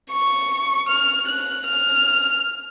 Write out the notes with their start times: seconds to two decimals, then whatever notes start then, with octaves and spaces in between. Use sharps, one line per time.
0.10 C#6
0.89 F6
1.28 F#6
1.67 F6